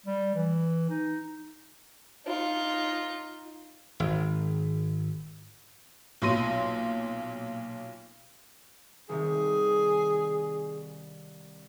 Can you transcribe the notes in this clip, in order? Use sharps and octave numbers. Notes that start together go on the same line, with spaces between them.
G3
E3
D#4
D#4 F4
G#1
B1 A#2 F4 C6 A#6 D#7
C2 C3 D#3 G#4